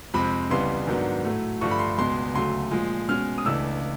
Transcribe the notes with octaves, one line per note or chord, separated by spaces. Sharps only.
F2 C3 F3 G#3 C4 B5
C#2 C#3 E3 G3 B3 C6
G#2 D#3 F#3 B3 D4
A2 F#3 A3
G2 D3 F3 A3 C#6
B5
C6
C#2 B2 G#3 C6
D2 C#3 F#3 A3 C6
A#2 F3 G#3
B2 G#3 C#4 F6
D#6
C#2 C#3 E3 A3 D4 E6